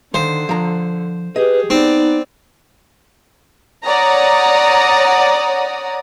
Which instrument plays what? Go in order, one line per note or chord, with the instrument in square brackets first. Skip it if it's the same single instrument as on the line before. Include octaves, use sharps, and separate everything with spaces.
[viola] D3 [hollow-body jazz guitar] D#3 F5 [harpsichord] C5
[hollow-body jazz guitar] F3 A#5
[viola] G4 G#4 [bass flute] B4 [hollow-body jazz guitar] D#5
[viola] B3 D5 [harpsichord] C4 [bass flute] D#4
[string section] C#5 D5 F#5 A#5 D#6